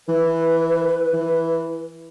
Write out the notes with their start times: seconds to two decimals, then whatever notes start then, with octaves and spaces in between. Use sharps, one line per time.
0.08 E3 B4
1.13 E3